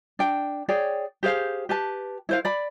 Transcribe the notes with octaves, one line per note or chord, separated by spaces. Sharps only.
D4 G5
G#4 C#5 D5 G5
G4 G#4 C5 F5
G4 B4 A5
E4 C5 F5
D5 B5